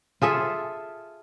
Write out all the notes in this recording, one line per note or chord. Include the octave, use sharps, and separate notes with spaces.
F4 G#4 A4 E5